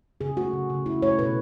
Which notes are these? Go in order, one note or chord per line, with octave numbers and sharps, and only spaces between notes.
C#3 G#4
A3 F#4
C#3
C#3
A3 E4
A3 C#5
B2 B4